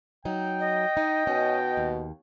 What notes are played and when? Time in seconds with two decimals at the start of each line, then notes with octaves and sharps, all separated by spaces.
0.25 F#3 D#4 G5
0.60 D#5
0.97 D#4
1.27 B2 C#4
1.77 D#2